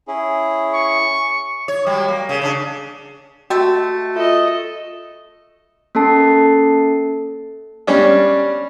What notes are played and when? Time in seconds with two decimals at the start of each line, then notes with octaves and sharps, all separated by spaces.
0.08 C#4 E4 G#4
0.74 C#6
1.68 C#5
1.86 F#3 G3
2.08 A#3
2.29 C#3
2.41 C#3 D4
3.50 A3 F#4 G4 D#5 E6
4.16 F4 A4 D#5 E5
5.95 A#3 C#4 A4 A5 C7
7.87 G3 C#4 D4